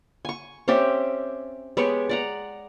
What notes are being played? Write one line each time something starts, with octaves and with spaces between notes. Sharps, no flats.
G#5 C#6
C4 C#4 G4 E5
G#3 B3 G4 C#5
D5 F#5 A#5